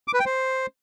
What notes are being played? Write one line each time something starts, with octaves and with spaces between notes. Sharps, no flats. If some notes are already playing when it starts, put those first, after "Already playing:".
D6
B4
G5
C5